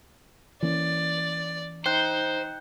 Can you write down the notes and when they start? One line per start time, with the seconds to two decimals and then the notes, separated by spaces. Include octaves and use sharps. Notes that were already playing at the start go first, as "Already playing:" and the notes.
0.63 E3 A#3 C#4 D5
1.86 D#4 C5 G5 F#6 G6